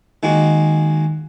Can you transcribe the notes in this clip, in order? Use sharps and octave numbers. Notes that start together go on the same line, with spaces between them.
D#3 G#3 A#3 F#4